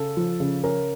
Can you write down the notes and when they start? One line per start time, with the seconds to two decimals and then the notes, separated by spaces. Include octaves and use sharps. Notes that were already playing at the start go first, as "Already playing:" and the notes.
Already playing: C#3 A4
0.17 F3
0.40 C#3
0.64 C#4 A#4